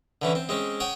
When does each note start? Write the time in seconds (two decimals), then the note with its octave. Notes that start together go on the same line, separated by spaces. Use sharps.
0.22 D3 E3 C#4
0.35 C4
0.49 G#3 C4 C#4
0.80 C#5 F#5 G5 D#6